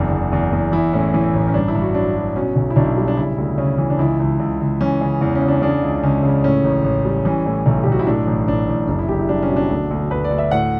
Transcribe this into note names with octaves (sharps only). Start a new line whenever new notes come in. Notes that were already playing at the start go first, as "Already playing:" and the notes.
Already playing: F#1 E2 D4
E2
E2
E2
E3 E4
A2 C#4
E3
A1
C#4
G2 D4
E4
G2
F#4
F#3 D4
F#3
B2 C#4
B1
E4
B1 D4
G3
D4
C#3 E4
D2
C#3 C#4
E3
D4
C#2 E4
C#2
C#2
C#2
E3 C#4
C#3
E2
C#4
C#3
D4
C#3 D4
C#2
C#2 C#4
C#3
A2 C#4
A1
A1
G3
E3 C#4
A2
B1
G4
B1
F#4
E4
A2 D4
A1
A1 D4
A1
F#1 D4
E4
F#1 G4
E4
G3 D4
C#4
B2
D4
D2
D2
D2 B4
D5
D2
E5
A2 F#5